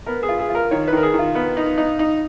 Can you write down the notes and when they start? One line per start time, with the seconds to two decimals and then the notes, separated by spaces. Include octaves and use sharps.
0.06 B3 A#4
0.23 G#4
0.28 F4
0.39 G#4
0.50 F4
0.55 A#4
0.71 D#3 C#5
0.88 B4
0.93 D#3 A#4
1.03 G#4
1.14 D#3
1.19 F4
1.35 B3
1.57 D#4
1.78 D#4
1.99 D#4